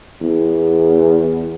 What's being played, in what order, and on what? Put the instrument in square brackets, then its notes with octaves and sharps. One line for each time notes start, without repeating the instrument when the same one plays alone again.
[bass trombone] E2